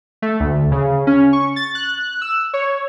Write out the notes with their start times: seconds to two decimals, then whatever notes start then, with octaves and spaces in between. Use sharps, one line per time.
0.22 A3
0.40 D2
0.72 C#3
1.07 C#4
1.33 C#6
1.56 A6
1.75 F#6
2.21 E6
2.53 C#5